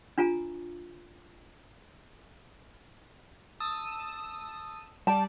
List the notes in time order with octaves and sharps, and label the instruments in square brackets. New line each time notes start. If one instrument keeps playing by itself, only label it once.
[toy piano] D4 F4 G#5 A#5
[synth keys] A5 D#6 E6
[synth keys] G3 D5 [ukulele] A5